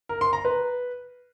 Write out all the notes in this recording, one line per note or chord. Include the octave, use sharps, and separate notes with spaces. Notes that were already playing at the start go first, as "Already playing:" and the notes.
A#4
C6
A#5
B4